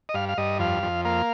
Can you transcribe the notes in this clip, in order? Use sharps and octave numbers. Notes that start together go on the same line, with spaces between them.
D#5
G2 F5
F5
G2 D#5
F2 F5
F2
A#3 F5